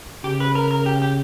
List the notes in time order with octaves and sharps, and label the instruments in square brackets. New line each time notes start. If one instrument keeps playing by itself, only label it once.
[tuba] C#3 [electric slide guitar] G4
[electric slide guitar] B4
A#4
A#4
G4
G4